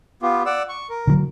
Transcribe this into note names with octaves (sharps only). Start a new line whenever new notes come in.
B3 F4 G4
D5 F#5 E6
C#6
A#4
D3 E3 F#3